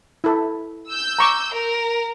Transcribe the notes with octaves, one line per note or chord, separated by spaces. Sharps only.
E4 A4
E6 G6
A#5 C#6 D6
A#4